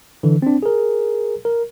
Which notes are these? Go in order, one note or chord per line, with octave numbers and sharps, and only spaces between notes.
D3 E3
C4 D4
G#4 A#4
A#4